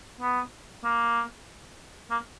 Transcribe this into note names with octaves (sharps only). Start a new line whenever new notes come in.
B3
A#3
A#3